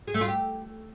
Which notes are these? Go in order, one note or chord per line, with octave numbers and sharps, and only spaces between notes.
G#4
A3
F4
G4